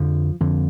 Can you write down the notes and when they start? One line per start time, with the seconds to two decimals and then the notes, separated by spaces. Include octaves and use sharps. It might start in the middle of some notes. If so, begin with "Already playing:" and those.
Already playing: F2 D3 F3
0.40 F2 D3